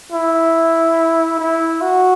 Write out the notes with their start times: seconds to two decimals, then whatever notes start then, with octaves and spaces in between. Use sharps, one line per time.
0.12 E4
1.39 E4
1.81 F#4